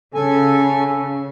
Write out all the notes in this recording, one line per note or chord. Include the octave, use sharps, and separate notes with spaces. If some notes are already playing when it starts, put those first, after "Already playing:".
C#3 A4 G#5